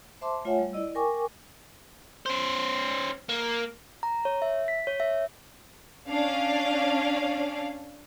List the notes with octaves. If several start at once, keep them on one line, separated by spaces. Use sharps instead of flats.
C5 E5 A5 C6 D6
A3 F4 C#5 E5 F#5 G#5
G3
E4 D5 D#5 E6
A#4 G5 G#5 C#6 D6
C#4 C5
A#3
A#5
C#5
E5
B6
C#5
E5
C#4 D4 F5